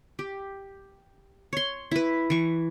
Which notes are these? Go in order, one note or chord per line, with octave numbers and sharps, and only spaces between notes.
G4
C#5 C6
E4 B4
E3 C#6